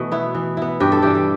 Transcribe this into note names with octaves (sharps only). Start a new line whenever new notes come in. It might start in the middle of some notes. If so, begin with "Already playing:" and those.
Already playing: B2 E3 A3
B3 E4
E3
B3 E4
G2 G4 B4
A4
E3 G3 G4
A4